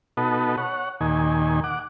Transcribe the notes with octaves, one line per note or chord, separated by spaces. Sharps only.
B2 B3 D#4 F#4 A4
C#5 F#5
D#2 A#2 D#3 G#5
F#5 D6